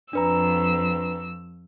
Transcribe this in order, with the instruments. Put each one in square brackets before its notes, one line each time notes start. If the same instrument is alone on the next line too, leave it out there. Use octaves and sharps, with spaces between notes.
[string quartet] F2 E6 [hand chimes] D4 B4 A#5